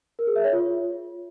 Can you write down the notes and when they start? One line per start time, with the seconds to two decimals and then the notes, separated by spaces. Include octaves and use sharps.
0.19 A#4
0.27 G#4
0.36 E5
0.44 C#5
0.53 F4